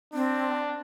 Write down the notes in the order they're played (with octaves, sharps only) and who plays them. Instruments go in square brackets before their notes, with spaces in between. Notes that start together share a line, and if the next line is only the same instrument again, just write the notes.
[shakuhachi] C4 [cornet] D4